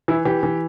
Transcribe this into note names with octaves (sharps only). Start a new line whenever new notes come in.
E3 E4
E3 G4
E3